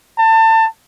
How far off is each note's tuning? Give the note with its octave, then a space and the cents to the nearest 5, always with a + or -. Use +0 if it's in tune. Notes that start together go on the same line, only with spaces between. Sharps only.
A5 +30